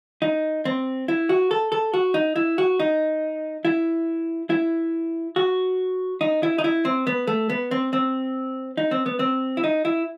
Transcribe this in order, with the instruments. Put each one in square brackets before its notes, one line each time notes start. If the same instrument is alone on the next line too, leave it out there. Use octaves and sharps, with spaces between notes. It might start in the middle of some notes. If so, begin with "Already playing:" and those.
[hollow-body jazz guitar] D#4
C4
E4
F#4
A4
A4
F#4
D#4
E4
F#4
D#4
E4
E4
F#4
D#4
E4
D#4
E4
C4
B3
A3
B3
C4
C4
D#4
C4
B3
C4
E4
D#4
E4